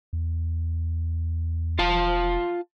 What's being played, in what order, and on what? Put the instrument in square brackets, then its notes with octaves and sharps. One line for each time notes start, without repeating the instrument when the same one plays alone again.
[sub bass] E2
[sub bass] E1 [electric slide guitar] F4 F5 A5